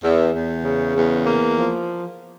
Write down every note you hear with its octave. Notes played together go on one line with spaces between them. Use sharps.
E2
E2
C#3
E2
A#3
F3